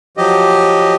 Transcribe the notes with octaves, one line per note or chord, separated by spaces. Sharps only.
F3 F#3 G4 D#5